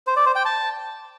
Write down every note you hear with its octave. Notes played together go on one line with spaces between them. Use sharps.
C5
D5
C5
G5
A5